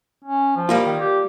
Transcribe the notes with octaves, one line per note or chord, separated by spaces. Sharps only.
C#4
F3
G3 A#3 F4
D#3
G4